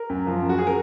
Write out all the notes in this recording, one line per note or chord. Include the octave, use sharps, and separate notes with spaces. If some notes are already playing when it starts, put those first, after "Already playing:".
Already playing: A#4
F#2
F3
F#2
F#4
G#4
A#4